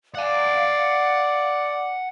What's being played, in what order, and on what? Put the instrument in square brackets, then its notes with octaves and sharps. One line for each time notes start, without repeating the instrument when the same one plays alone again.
[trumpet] D5 [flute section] F5 [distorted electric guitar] F#5 G#5